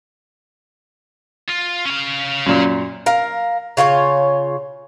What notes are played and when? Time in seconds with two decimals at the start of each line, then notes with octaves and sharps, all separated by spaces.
1.49 F4
1.85 C#4 F5
2.46 F#2 A#2
3.06 A#4 F5
3.77 C#3 F4 G4 C#5